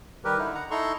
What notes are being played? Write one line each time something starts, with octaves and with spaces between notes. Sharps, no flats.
D#3 G3 G4 A#4 B4
D3 D#4 E4
F#5 A#5
D#4 E4 A4 A#5 C6 C#6